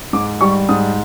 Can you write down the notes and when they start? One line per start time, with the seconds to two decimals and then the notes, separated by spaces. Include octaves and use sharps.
0.13 G#2 D6
0.41 G3 C#6
0.69 G#2 D#6